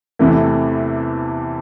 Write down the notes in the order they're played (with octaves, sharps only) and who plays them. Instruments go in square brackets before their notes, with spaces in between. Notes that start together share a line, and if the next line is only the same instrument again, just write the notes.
[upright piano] E2 C3 E3 A3